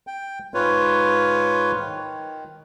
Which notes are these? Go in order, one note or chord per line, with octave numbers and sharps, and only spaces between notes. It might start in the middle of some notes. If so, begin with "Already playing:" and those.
G5
G#2 F4 B4 C#5
D#3